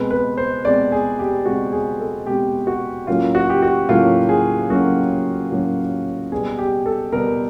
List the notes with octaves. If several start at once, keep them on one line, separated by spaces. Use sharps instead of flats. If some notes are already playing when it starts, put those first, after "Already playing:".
Already playing: B2 G#3 C4 B4
B4
C5
B2 G#3 C4 D5
G#4
G4
B2 G#3 C4 F#4
G#4
A4
B2 G#3 C4 G4
F#4
A2 F#3 A#3 C#4 F4
F#4
G4
F#4
A2 F#3 A#3 C#4 F4
G#4
A2 F#3 A#3 C#4 F#4
A2 F#3 A#3 C#4
B2 G3 B3 G#4
G4
A4
B2 G3 B3 A#4